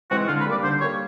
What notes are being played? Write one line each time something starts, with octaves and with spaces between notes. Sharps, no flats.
E3 G#3 C4 F#4
D3 F4
B4
G3 A#3 D5
D3 C5
G3 A#3 C#5